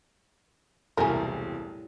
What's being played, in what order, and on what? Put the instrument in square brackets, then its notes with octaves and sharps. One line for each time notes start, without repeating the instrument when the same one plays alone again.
[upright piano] E1 C2 [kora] A2 G3 [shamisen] G#4 A#4